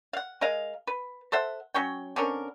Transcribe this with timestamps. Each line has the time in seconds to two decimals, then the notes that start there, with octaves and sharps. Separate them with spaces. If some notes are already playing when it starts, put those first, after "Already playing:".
0.13 F5 F#5
0.41 G#3 A#4 D#5 F5
0.87 B4
1.32 A4 C5 E5 F#5
1.74 F#3 C#4 C#5 G5
2.16 D3 C4 C#4 A#4